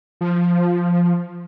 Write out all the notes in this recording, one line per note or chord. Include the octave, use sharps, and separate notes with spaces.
F3